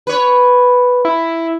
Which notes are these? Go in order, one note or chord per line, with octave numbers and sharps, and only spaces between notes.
B4 C#5
E4